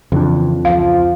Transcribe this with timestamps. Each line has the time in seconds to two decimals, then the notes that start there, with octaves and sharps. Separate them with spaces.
0.12 F2 C#3 E3 D4
0.65 C#2 F3 F5